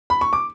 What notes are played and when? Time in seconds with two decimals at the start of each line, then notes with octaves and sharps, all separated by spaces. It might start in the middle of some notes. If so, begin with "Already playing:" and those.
0.10 B5
0.21 C#6
0.33 D6